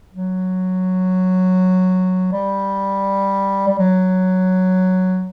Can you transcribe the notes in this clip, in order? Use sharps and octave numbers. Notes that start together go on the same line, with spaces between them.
F#3
G3
G3
F#3